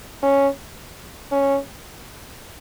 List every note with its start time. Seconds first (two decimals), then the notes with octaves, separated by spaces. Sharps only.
0.23 C#4
1.32 C#4